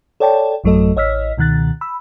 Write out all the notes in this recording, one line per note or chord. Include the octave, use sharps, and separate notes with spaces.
A4 C#5 D5 G5 A5
A1 F#2 F#3 A3 A4 D#5
A1 C#5 D#5 E6 F6 B6
C#2 B2 D#3 F#6 A6
B5 E6